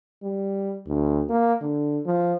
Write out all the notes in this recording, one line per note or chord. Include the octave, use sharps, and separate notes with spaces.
G3
D2
A#3
D3
F3